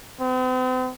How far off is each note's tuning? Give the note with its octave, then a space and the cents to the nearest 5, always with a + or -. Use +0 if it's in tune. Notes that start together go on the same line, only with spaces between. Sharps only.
C4 -45